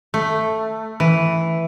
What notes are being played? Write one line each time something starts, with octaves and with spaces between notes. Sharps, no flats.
A3
E3